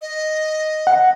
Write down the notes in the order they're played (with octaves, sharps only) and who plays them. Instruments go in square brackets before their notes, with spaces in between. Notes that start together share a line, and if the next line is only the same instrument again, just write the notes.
[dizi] D#5
[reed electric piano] F#5